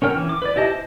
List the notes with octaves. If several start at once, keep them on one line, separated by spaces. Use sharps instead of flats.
C#4 A#4 G5 F6
E3 C#4
D6
B4 D5
E4 G4 D#5 A5
C5